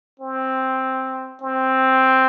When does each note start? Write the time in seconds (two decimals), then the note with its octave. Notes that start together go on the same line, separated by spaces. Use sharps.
0.20 C4
1.42 C4